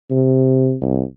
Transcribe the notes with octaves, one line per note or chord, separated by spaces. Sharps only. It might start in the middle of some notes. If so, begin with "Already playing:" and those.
C3
C2